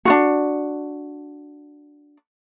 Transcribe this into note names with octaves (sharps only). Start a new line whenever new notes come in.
D4 F4 F#4